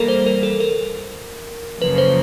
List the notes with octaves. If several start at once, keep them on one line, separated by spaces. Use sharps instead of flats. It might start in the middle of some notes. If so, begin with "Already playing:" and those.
Already playing: E3 G3 A#3 A4 A#4
C5
A#4
A4
A#4
F#2 C#3 F3 A#3 B4
C5